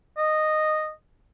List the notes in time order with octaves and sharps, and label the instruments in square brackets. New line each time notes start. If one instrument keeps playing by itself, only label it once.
[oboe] D#5